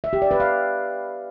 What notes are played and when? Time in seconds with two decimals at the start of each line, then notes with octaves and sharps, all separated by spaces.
0.04 E5
0.13 G4
0.22 D5
0.31 B4
0.40 F5